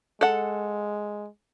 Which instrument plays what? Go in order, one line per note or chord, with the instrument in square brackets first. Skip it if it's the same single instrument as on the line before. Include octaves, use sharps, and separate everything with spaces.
[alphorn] G#3 [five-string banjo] A4 F#5